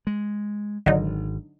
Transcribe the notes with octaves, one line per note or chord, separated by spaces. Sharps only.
G#3
G#1 D3 F#3 D#4